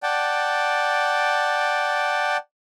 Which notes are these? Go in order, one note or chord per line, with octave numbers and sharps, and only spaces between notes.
D5 F#5 G5 A5